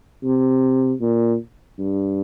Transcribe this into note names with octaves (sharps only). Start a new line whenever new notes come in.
C3
A#2
G2